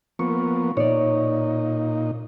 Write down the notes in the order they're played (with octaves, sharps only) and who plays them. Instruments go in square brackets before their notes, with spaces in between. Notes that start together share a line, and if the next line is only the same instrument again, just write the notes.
[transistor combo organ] F3 A#3 B3 [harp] C#6
[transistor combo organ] A#2 D#4 [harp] C#5 D5